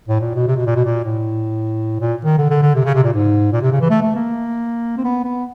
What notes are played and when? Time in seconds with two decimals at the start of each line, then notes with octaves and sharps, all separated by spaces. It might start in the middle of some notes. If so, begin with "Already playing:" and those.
0.08 A2
0.21 A#2
0.35 B2
0.47 C3
0.57 B2
0.66 A#2
0.76 B2
0.85 A#2
1.04 A2
2.00 A#2
2.24 D#3
2.38 D3
2.50 D3
2.62 D3
2.75 C3
2.85 C#3
2.95 C3
3.04 A#2
3.13 G#2
3.53 A#2
3.61 C3
3.71 C#3
3.81 E3
3.90 A3
4.02 A3
4.16 A#3
4.97 C4
5.04 B3
5.24 B3